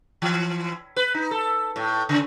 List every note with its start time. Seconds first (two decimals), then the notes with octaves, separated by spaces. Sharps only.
0.22 E3
0.96 B4
1.14 D#4
1.31 A4
1.76 A2
2.09 C#3